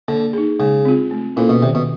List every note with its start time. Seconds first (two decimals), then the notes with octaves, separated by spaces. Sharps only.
0.08 D3 A#3
0.33 D#4 G#4
0.59 C#3 G#3
0.85 C4 F4
1.11 A3
1.36 A#2 C#4 E4 A4 C5
1.49 B2
1.62 C3 D#3
1.75 B2